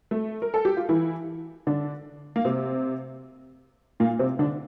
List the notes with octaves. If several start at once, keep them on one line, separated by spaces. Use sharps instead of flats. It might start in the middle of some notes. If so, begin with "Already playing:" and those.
A3
A#4
A4
G4
F4
E3 E4
D3 D4
A#3
C3 C4
A#2 A#3
C3 C4
D3 D4